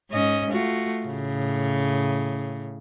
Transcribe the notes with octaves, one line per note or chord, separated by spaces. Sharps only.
G#2 C#4 D#5
A3 F4 F#4
A2 C#3